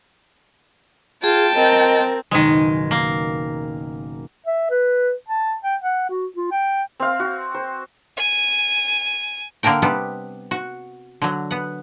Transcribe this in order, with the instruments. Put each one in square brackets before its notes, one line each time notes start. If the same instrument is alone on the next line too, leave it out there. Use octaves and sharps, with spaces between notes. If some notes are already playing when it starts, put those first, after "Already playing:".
[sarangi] F4 [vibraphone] G#4 [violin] G5 A5
[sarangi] C4 [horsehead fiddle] A#4 [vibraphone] D#5
[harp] F#1 B2 D#4 [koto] D#3 G#3
[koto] A#3
[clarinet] E5
B4
A5
G5
F#5
F#4
F4
G5
[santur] C4 F5
F#4
C5
[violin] G#5
[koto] D3 A#3 D4 A#4 G5
C3 G3 B3 D4
F#4
D3 F#3
B3 F#5